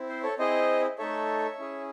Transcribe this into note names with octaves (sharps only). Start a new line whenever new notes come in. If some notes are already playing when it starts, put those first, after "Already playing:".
Already playing: C4 E4
C5
A4 C#5
C4 E4 G#4 C5 D#5
A3 D#4 A4 C#5 E5
C#4 E4 G#4